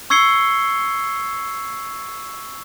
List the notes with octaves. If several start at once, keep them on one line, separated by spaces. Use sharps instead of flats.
C#6 E6 G#6 C7 C#7 G7